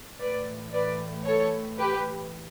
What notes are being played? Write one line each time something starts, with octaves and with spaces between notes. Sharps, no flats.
A2 E3 B4 D5
B4 D5
A4 C#5
G4 B4